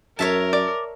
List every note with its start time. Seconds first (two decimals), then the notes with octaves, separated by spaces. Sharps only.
0.19 F#2 A#4 C#5 E5 A5
0.53 D5